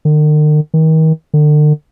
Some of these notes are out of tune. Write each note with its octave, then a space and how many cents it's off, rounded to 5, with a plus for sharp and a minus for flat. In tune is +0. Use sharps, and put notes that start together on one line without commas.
D#3 -45
D#3 +35
D3 +40